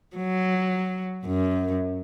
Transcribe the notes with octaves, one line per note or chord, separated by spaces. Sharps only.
F#3
F#2